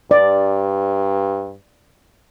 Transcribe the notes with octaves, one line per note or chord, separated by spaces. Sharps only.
G2 D5